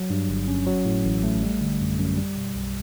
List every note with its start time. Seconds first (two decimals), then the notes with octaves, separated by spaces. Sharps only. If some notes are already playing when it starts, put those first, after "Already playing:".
Already playing: F#3
0.10 G2
0.29 G1
0.48 C#4
0.67 F#3
0.85 A2
1.05 A1
1.23 A3
1.42 G3
1.61 D3
1.80 F#2
1.99 F#2
2.17 G3
2.37 B2
2.55 B1